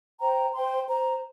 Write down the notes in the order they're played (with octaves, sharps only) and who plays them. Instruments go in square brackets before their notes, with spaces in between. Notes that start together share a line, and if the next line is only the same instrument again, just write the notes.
[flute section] C5 G5 A#5
C5 G5 C6
C5 A#5